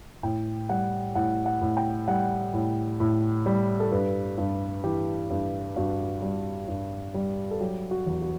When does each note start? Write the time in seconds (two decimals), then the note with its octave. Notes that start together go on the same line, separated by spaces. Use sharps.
0.23 A2 G5
0.69 G3 F#5
1.15 A2 F#5
1.46 F#5
1.61 A2
1.77 G5
2.08 G3 F#5
2.54 A2
3.00 A2
3.46 G3
3.80 A4
3.92 G2 B4
4.38 G2
4.84 E3 G4
5.30 G2
5.76 G2 F#4
6.22 G3
6.68 G2
7.14 G3
7.51 A4
7.61 F#3 G4
7.91 F#4
8.07 E2
8.22 F#4